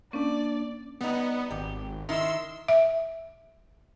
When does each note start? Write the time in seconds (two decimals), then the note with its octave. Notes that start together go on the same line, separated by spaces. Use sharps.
0.13 A#3 C#4 D4 D5
1.01 G3 B3 D#4
1.51 G#1 G4
2.09 D#3 E4 C6 E6
2.68 E5